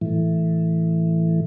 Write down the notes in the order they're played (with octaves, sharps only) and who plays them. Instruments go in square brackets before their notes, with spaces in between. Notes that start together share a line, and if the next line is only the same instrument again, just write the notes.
[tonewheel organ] A2 E3